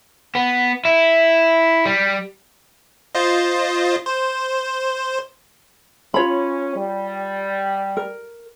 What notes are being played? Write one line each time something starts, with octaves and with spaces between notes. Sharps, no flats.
B3
E4
G3
F4 C5 D#5
C5
C#4 F4 C#5 B5
G3
A#4